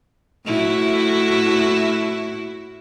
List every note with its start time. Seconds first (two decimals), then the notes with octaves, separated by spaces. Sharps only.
0.45 A2 E4 F#4